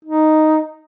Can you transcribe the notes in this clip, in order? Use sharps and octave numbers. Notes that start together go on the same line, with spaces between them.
D#4